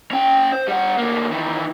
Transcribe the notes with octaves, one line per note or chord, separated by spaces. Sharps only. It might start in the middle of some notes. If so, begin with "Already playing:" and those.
C#4 G5
C5
G3 F#5
D2 A#3
D#3 E3